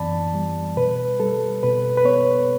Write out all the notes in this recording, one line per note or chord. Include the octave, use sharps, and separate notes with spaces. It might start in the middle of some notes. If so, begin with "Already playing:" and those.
Already playing: F#2 E3 B3 D5 A5 B5
G3
B2 B4
G3 A4
B2 B4
B4
B3 C#5